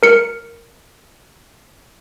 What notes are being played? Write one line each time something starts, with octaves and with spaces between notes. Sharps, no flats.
A#4 C#7